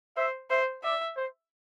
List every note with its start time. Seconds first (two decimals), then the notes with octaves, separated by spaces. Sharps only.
0.17 C5 E5
0.50 C5 E5
0.83 D5 E5
1.17 C5